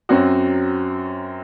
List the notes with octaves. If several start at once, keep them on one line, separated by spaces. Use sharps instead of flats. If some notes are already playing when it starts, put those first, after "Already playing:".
F#2 F#3 C4 F#4